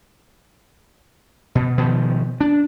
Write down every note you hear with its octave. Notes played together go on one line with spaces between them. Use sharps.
B2
B2 D#3 F3
D4